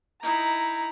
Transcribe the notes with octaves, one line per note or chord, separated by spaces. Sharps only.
D#4 E4 A#5